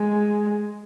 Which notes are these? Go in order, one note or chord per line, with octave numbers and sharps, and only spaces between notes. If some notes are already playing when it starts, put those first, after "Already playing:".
Already playing: G#3